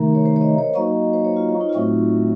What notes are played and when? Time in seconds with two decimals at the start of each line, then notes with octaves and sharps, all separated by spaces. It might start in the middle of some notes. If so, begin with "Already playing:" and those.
Already playing: C3 D#3 A3 D#4 A#4
0.15 C#5
0.25 C5
0.36 C#5
0.41 D#5
0.58 C#5
0.75 F#3 A#3 D#4 F#4 D#5
1.13 C5
1.24 C#5
1.36 F4
1.49 F4
1.61 D#4
1.69 F4
1.74 A2 F#3 A3 C4 D#4 F#4